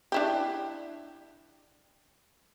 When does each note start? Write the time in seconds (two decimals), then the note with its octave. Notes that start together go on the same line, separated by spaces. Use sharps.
0.12 D4 E4 G4